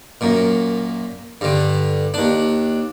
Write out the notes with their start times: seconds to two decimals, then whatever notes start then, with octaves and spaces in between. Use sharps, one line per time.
0.21 F#2 A#2
1.41 G2 D3
2.14 D#2 D4